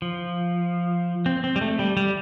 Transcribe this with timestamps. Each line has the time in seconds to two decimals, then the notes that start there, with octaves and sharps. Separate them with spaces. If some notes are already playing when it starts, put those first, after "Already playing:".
0.02 F3
1.26 C4
1.44 C4
1.56 G3
1.61 A3
1.79 G3
1.97 G3